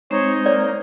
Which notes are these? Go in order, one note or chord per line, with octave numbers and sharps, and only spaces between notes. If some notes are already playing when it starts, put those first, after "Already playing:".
G#3 C4 D#4 C5 C#5
A#3 C#5 D5